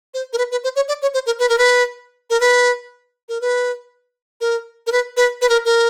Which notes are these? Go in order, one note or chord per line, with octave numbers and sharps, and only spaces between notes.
C5
A#4
B4
B4
C5
C#5
D5
C#5
C5
A#4
B4
A#4
B4
A#4
B4
A#4
B4
A#4
A#4
B4
B4
B4
A#4
A#4